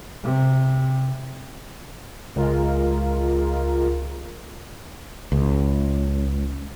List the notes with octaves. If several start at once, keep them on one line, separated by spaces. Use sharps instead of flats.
C3
C#2 G#3 F4 A#4
C#2